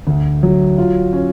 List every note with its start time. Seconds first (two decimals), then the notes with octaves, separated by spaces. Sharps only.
0.07 D2
0.43 F#3
0.78 F4
1.13 C#4